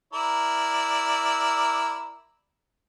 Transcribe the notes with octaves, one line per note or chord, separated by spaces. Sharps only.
E4 A#4 D5